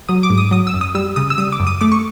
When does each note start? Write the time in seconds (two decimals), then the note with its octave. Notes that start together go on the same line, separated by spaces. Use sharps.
0.09 F#3 D#6
0.23 D6
0.30 G#2
0.38 D#6
0.51 F#3 D#6
0.67 E6
0.73 F#2
0.81 D#6
0.95 G3 E6
1.16 C#3 D#6
1.30 E6
1.38 G3 D#6
1.52 D6
1.60 F#2
1.67 D#6
1.81 A3 D6
1.92 C#6